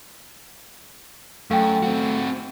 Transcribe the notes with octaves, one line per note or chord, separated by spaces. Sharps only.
F#2 A3 F5 G5
C4 F#4